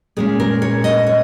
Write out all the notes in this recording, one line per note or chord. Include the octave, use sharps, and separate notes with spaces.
A#2 G#3 C#4 G#4
A#4
C#5
D#5
C#5